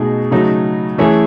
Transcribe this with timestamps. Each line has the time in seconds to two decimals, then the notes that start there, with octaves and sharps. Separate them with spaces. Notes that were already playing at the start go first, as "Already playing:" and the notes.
Already playing: B2 A3 D#4 G#4
0.31 C#3 F#3 A3 D#4
0.98 E3 A3 C#4 E4 G#4